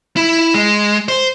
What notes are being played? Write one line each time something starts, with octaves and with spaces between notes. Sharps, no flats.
E4
G#3
C5